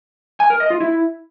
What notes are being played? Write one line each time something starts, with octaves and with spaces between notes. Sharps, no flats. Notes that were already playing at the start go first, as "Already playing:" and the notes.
G#5
A#4
D#5
F4
E4